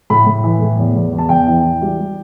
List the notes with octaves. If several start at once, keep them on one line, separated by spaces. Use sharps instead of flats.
A2 B5
A2
E3
A2
E2
E2
E2
A5
E2 G5
E3
E3
G3
G3